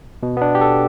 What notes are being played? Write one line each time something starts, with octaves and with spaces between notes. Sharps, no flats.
B2
B3
D4
G4
A4